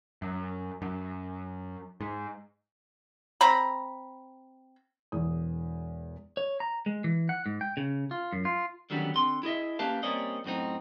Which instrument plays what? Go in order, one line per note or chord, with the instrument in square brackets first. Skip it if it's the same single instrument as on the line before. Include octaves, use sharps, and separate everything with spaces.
[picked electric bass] F#2
F#2
G#2
[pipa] C4 A#5 B5
[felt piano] E1 E2 D#6
[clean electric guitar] C#5
A#5
G#3
E3
F#5
G#2
G5
C#3
F4
F#2
F4
D3 D#3 F#3 G3 B3 C#4
D3 C4 C6
E4 G#4 D#5 E5
A#3 C#4 G4 B4 F5 A5
G3 A#3 C4 C#4 D5 D#5
F#2 A2 C4 D#4